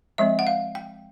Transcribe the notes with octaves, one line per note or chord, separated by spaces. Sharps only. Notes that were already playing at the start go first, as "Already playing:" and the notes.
F3 G#3 C4 E5
F#5
F5
G5